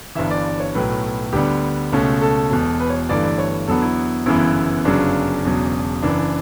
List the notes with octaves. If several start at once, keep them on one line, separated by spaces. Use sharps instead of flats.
G1 G2 E3 E5
D5
D5
C#5
B1 A2 F#3 B4
D2 D3 G3 B3 G4
C#2 B2 A3 C#4
A4
E1 E2 B2
B4
C#5
G1 G2 E3 A3 D5
D5
C#5
E2 D3 F#3 B3 A4
E4
G1 F#2 C#3 E3 B3 E4
G1 F#2 C#3 F#3 D4
E1 E2 C#3 F#3
F#1 F#2 E3 D4